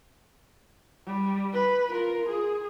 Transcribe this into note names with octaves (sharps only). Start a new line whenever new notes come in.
G3
B4
F4 A#4
G#4